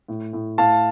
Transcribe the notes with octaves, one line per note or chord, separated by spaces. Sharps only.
A2
A2
A2 F5 A5